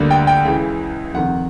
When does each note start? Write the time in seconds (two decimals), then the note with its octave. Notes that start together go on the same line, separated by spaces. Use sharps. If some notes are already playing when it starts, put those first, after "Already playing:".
Already playing: D2 D3 G3 A#3
0.11 G5
0.27 G5
0.45 C#2 C#3 E3
1.14 F2 C3 D#3 F#5